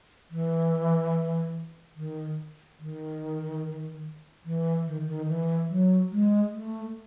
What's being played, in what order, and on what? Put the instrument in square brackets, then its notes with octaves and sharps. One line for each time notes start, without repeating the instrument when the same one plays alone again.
[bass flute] E3
D#3
D#3
E3
D#3
D#3
E3
F#3
G#3
A3